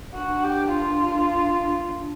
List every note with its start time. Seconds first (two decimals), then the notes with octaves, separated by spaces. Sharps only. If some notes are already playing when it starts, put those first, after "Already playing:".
0.15 D4 F#4
0.44 G4
0.74 F4
1.91 D4